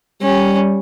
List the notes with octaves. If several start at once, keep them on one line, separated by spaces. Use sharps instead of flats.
G3 C#4